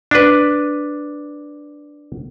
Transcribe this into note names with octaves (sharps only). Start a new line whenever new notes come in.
D4 B4